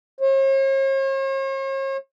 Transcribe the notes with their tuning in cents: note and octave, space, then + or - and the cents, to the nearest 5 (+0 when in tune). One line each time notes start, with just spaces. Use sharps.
C#5 -45